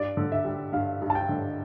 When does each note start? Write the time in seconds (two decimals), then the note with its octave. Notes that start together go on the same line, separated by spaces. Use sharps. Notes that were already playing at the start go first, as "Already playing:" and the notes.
Already playing: G2 D5
0.17 D3
0.32 E5
0.45 G3
0.73 G2 F5
1.02 G2
1.10 A5
1.15 G5
1.29 D3